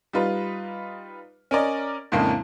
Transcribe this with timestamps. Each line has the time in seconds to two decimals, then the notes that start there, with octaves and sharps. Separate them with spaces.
0.13 G3 D#4 F4 B4
1.51 C#4 A#4 D5 D#5
2.12 F2 A2 C#3 G#3 A#3 D4